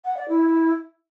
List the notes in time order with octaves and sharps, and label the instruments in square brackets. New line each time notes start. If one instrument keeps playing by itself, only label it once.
[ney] F#5
D5
E4